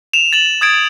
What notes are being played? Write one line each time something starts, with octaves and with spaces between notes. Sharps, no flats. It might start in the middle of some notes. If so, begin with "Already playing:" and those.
E7 F7
A6 E7 F#7
D#6 G#6 A6 D7